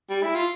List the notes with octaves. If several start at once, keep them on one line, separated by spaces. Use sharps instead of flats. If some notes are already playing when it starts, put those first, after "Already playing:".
G3
E4
F4